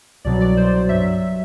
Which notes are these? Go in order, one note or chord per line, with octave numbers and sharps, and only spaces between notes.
C2 B2 F#3 D5
D5
C5
G2 F#3 E5